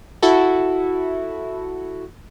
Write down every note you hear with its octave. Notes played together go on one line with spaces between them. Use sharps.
E4 F#4 A4